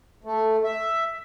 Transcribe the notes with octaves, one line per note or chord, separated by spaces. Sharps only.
A3
E5